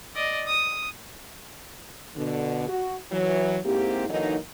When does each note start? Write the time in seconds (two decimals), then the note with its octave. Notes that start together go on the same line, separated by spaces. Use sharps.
0.15 D5 D#5
0.47 D#6
2.16 B2 D3
2.68 F#4
3.11 E3 F#3
3.65 G#2 A#3 C4 E4 G4
4.09 D3 E3 F#3 A#3 D#4